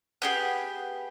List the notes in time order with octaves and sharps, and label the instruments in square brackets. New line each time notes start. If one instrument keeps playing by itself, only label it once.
[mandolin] B3 G4 G#4